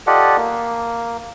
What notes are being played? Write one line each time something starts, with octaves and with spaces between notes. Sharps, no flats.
F4 G4 A4 D5 D#5 F#5
A#3